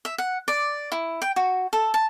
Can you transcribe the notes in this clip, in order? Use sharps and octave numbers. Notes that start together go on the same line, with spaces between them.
E5
F#5
D5
E4
G5
F#4
A4
A5